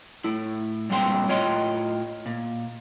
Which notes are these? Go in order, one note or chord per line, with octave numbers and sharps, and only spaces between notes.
A2 E4
G2 A#2 G#3 C4 G5 C6
A2 F4 C#5 D#5 G5 C6
A#2